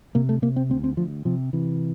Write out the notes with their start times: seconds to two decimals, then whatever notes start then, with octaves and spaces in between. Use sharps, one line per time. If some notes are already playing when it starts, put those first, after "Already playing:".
0.15 C3 A#3
0.29 A3
0.42 C3 A#3
0.56 C4
0.70 D2 C4
0.84 C4
0.97 D2 F3
1.25 C3 F3
1.53 C3 E3